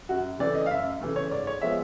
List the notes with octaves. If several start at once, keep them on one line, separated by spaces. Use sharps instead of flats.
F#2 F#4
C#3 E3 A3 D5
D#5
F5
F#2 E5
C#3 E3 A3
C#5
G#2 D5
C#5
F3 G#3 B3 E5